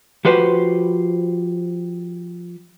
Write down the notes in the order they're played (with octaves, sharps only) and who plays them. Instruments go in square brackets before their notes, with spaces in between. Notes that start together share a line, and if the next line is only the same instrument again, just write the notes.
[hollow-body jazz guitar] F3 F#4 G4 B4 C5